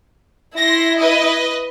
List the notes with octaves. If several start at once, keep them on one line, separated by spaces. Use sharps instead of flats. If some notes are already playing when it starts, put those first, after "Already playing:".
E4 C6 A#6
B4 D#5